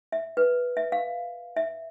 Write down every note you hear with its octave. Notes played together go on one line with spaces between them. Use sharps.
E5
B4
E5
F5
E5